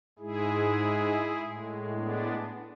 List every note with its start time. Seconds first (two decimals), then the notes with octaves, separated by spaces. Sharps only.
0.19 G#2 G#3 E4 G#4
1.36 A2 G#3
1.94 B3 D4